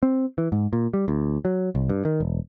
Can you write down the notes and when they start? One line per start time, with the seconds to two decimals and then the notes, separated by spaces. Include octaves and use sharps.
0.03 C4
0.38 E3
0.52 G#2
0.73 A#2
0.94 G3
1.08 D2
1.45 F#3
1.75 C2
1.89 G2
2.05 D#3
2.20 E1